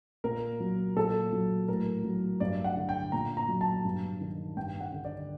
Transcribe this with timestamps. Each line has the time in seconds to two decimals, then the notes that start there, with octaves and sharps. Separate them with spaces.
0.24 A#2 A#4
0.60 F#3
0.96 A#2 A4
1.33 F#3
1.68 A2 A#4
2.04 F#3
2.40 G2 D5
2.64 F#5
2.76 D3
2.89 G5
3.12 A#2 A#5
3.37 A#5
3.49 F#3
3.61 A5
3.85 G2
4.21 D#3
4.57 G2 G5
4.80 F#5
4.92 D3
5.05 D5